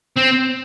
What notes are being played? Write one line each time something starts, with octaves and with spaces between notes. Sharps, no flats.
C4